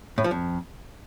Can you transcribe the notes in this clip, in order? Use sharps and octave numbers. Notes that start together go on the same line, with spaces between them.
A2
F3
F2